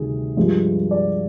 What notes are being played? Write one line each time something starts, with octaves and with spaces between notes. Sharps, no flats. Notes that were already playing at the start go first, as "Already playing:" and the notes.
Already playing: D2 C3 D#3 G3 G#4
G2 F3 G#3
D5